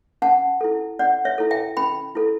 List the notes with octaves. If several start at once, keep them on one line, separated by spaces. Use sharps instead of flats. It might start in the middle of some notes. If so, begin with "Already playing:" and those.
C#4 F#5 A5
E4 A4
C#4 D5 F#5
C#5 E5
E4 A4
E5 G5
C#4 G5 B5
E4 A4